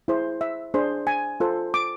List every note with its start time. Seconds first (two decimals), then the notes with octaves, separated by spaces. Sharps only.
0.08 E4 G#4 C5
0.41 E5
0.74 D4 G#4 C5
1.07 G#5
1.40 F4 A4 C5
1.74 D6